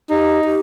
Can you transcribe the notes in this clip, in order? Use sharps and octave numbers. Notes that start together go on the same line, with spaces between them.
D#4 G4
G4